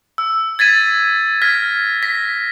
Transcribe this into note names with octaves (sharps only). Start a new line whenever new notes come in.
E6
G#6 A6 B6 D#7
F6 G#6 A#6 B6
A#6 B6